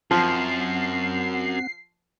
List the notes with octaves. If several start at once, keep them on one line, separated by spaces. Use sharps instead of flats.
F#2 F3 C4 F#5 C7